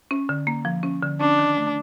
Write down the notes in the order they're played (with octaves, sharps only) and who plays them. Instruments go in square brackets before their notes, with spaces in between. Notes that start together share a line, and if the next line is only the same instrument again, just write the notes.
[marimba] C#4
D3
A#3
F3
C#4
D3
[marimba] C#4 [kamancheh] D4
[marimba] D#3
A3